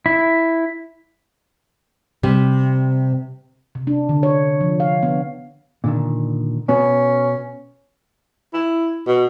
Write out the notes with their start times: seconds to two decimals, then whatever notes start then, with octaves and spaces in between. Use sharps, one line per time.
0.06 E4
2.23 C3 G3
3.75 C3
3.87 D4
4.09 D3
4.23 C#5
4.61 F3
4.80 F5
5.03 B3
5.84 A#2 D3 D#3
6.68 B2 B3 C#4 F#4
8.53 E4
9.07 B2